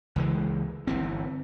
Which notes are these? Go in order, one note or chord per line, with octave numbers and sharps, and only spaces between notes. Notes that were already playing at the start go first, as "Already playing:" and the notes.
C#2 E3 G#3
G1 E3 C4